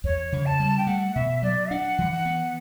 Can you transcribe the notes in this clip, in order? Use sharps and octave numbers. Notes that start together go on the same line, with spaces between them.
E2 C#5
C#3
A5
G3
G5
A3 F#5
B2 E5
F#3 D5
D4 F#5
E3
F#5
B3